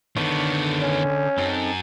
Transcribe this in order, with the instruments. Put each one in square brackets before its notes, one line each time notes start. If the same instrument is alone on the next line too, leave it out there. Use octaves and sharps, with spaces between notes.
[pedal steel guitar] D3 A4 C#5 [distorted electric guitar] D#3 B3
[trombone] C#4
[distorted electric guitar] F#2 [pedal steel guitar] C4 D#4 A4